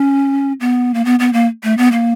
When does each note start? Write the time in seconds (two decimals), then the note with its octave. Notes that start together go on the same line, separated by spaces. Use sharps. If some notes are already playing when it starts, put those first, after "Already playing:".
Already playing: C#4
0.60 B3
0.94 A#3
1.05 B3
1.20 B3
1.33 A#3
1.63 A3
1.78 B3
1.92 A#3